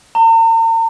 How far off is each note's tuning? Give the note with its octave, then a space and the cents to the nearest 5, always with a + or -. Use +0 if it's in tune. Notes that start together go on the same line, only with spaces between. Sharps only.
A#5 -45